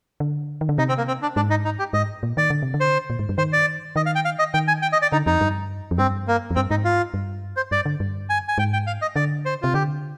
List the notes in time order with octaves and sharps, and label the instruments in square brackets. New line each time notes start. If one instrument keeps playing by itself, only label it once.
[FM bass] D3
D#3
D3
[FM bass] C3 [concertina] D#4
[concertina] C4
A#3
C4
D4
[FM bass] G#2 [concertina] D4
[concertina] D#4
D#4
G4
[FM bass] G#2 [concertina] D#5
[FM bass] A#2
[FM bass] D#3 [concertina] D5
[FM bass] D3
C3
D3
[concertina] C5
[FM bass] A#2
G#2
G2
[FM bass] D#3 [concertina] C5
[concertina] D5
[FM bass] D#3 [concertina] D#5
[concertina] F5
G5
F5
D#5
[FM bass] D#3 [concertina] G5
[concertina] G#5
G5
D#5
D5
[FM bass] D3 [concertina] D#4
[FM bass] F2 [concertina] D#4
[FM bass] G2
F2
[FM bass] G2 [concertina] C4
[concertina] A#3
[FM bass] F2
[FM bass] G2 [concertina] C4
[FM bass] G#2 [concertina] D#4
[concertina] F4
[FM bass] G2
[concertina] C5
[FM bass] G2 [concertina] D5
[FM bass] D3
G2
[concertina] G#5
G#5
[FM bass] G#2 [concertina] G5
[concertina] G5
F5
D#5
[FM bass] D3 [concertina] D5
[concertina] C5
[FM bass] C3 [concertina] F4
[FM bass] D3 [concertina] G4